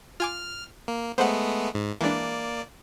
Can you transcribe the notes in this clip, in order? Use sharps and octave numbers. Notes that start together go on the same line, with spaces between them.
F4 G#5 D6 F6
A#3
G#3 A3 B3 C5 F#5
G#2
E3 G#3 A#3 D4 D5